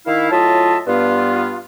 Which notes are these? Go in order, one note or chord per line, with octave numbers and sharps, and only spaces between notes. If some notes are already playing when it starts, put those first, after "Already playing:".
D#3 E4 F5
A2 F#3 F4 D#5 E5 A5
G2 B3 F4